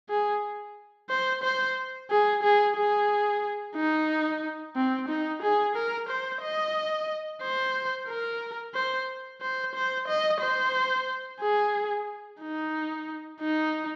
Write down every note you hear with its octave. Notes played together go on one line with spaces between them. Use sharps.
G#4
C5
C5
G#4
G#4
G#4
D#4
C4
D#4
G#4
A#4
C5
D#5
C5
A#4
C5
C5
C5
D#5
C5
G#4
D#4
D#4